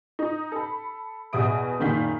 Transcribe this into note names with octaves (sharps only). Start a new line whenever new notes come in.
D#4
A4 B5
E2 B2 E5 D#6 D7
F#1 A#2 D#3 F5 G6 B6